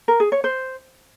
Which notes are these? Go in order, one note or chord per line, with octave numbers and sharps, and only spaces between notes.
A#4
G#4
C#5
C5